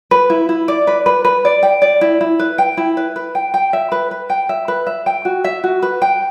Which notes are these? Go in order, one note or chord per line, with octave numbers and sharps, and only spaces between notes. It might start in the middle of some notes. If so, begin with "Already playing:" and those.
B4
E4
E4
D5
B4
B4
B4
D5
G5
D5
E4
E4
B4
G5
E4
B4
B4
G5
G5
E5
B4
B4
G5
E5
B4
E5
G5
F#4
E5
F#4
B4
G5